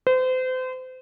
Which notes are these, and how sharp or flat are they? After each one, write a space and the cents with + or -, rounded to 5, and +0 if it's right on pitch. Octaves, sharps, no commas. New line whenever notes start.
C5 -35